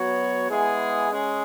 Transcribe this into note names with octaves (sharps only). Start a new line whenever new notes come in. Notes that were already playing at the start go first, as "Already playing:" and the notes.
Already playing: F#3 B3 F#4 C#5
G#3 B3 E4 G#4
G#3 C#4 G#4